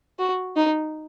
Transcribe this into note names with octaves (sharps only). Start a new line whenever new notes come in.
F#4
D#4